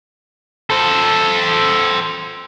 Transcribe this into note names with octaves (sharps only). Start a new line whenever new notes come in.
A4 C5